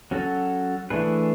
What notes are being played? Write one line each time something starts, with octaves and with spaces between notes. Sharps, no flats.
F#3 C#4 F#4 A4
E3 A3 D4 G#4 B4